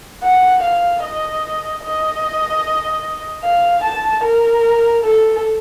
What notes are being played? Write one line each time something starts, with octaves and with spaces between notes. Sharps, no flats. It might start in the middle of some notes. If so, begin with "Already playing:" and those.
F#5
F5
D#5
D#5
F5
A5
A#4
A4